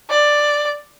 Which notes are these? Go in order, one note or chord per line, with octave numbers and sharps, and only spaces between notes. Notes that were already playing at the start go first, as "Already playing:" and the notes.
D5